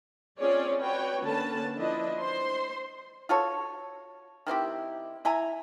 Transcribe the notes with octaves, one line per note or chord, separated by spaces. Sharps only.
C4 C#4 F4 G#4 C#5 D5
F#4 B4 C#5 G5
D3 A#3 C#4 B4 A5
F3 D4 E4 B4 D#5
C5 C6
F4 F#4 A4 C#5
D#3 C4 E4 G4
E4 E5 G#5 A#5